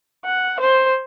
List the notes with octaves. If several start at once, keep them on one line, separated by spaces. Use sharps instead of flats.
F#5
C5